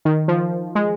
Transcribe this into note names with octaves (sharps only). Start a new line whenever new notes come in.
D#3
F3
G#3